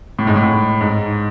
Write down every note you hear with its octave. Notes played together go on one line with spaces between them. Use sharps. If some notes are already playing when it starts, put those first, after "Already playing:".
A2
G#2
A2
G#2